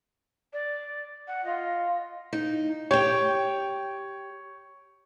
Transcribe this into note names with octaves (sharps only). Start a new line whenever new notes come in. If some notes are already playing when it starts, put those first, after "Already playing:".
D5
F#5
F4 D#5
D#4
G4 C#5 G5